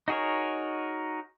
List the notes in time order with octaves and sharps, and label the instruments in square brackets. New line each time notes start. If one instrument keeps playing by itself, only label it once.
[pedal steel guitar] D#4 F#4 G#4 A#4 C#5